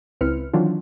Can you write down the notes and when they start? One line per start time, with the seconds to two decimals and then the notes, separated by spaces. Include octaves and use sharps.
0.21 C#2 C4 E4 B4 F6 C#7
0.53 D#3 E3 F#3 C4 D4 F4